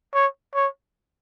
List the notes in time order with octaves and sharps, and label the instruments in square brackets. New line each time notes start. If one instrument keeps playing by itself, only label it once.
[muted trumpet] C#5
C#5